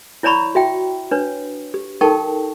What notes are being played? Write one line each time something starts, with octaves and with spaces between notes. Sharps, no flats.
E4 C#5 D5 A#5 B5 C#6
F#4 E5 G5
D4 B4 C#5
G4
D#4 A4 A#4 G5 A5 C#6